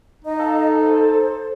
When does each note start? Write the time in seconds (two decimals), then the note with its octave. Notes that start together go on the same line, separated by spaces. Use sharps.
0.25 D#4 D#5
0.39 A4 D#5 F5
0.82 C5